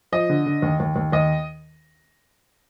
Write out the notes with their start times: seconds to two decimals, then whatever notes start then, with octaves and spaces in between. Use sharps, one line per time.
0.12 F3 D#5
0.29 D3
0.46 D3
0.62 D#2
0.80 D#2
0.96 D#2
1.12 D#2 D#5